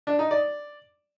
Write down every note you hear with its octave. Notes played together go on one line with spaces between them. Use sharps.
D4
D#4
D5